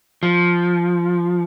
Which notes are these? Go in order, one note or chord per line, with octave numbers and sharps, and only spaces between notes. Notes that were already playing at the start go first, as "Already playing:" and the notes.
F3